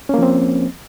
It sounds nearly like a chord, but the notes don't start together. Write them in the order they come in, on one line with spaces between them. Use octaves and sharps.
C#4 A#3 F3 C4